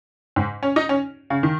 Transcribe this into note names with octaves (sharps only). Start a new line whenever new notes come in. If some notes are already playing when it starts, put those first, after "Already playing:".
G#2
C#4
D#4
C#4
C#3
D#3